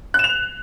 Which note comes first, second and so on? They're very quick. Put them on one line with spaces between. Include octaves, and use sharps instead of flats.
F#6 E7 F7